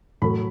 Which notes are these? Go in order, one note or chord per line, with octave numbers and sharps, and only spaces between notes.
A2 F#3 A3 B5